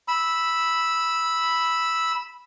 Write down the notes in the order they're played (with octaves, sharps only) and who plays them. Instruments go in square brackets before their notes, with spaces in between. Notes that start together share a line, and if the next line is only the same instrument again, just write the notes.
[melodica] B5 E6